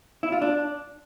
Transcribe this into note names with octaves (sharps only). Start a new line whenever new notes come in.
E4
F4
D4